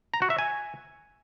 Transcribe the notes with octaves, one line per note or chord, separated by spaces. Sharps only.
A#5
F#4
E5
G#5